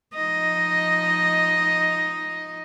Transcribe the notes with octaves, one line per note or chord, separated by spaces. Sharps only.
F3 D#4 D#5